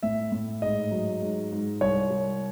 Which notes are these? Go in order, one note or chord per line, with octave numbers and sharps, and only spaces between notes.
A2 E5
A2
G#2 D#5
F#3
G#2
G#2
C2 C#5
C2